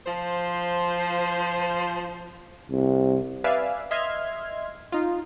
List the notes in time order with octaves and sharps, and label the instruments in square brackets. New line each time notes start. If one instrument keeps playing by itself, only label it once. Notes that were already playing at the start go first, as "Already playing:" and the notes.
[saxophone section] F3 C5
[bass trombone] C2
[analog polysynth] B4 D5 E5 F5 G#5
D#5 E5 C6 F6 G#6
D#4 F4